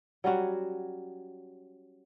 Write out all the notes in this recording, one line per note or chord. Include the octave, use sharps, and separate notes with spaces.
F#3 G3 C#4 F#4